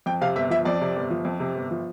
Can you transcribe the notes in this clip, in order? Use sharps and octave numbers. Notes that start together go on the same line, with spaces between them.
F2 G5
C3 F5
G1 E5
F3 E5
F2 D5
C3
G1
F3
F2
C3
G1
F3